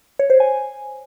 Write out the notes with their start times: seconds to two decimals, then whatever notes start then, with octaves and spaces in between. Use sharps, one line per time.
0.19 C#5
0.30 C5
0.40 G#5